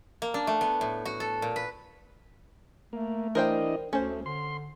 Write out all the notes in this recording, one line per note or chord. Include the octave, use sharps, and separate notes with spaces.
A#3
D4
A3
B3
A2
F#4
A4
A#2
B4
A3 A#3
E3 D4 A#4 C5 D#5 G5
D2 A3 C#4 C5
D3 C6